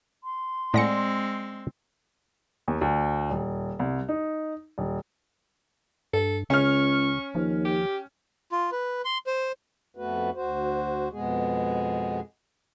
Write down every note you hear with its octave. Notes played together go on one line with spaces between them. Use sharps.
C6
A2 G#3 C4 D5 F#5 G#5 A#6 C#7
D#2
D2
D#1
C2
D#4
D#1
G2 A4
C#2 C#3 C#4 C#6 F6
D#2 F3
G4
F4
B4
C6
C5
F2 A3 B3 F#4 B4
D2 F#4 C5
F2 B2 G#3 B3 G#4